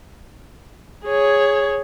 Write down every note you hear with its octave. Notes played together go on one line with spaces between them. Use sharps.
G#4 C#5